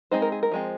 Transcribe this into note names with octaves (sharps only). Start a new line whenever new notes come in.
G#3 C4 D#4 C5
A#4
G#4
A#4
F3 G#3 C4